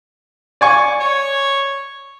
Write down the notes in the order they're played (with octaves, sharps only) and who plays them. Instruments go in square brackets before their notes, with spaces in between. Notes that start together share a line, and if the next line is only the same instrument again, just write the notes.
[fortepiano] D5 G#5 C#6
[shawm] C#5